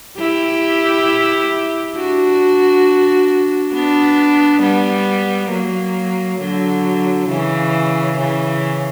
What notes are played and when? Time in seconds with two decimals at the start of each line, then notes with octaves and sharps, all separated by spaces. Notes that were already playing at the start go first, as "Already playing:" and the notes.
0.18 E4 G4
1.96 D4 F#4
3.74 B3 D4
4.62 G3 B3
5.51 F#3 A#3
6.40 D3 F#3
7.29 C#3 E3
8.18 C#3 E3